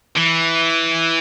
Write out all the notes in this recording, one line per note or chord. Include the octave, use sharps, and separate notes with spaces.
E3